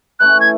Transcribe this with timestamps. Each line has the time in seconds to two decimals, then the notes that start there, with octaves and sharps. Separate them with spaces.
0.20 E3 A3 C#4 F#6
0.41 G#6